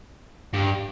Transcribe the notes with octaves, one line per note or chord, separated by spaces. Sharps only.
G2